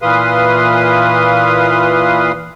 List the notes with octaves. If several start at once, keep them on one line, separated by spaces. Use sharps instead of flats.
A#2 E3 B4 F5 C6 D#6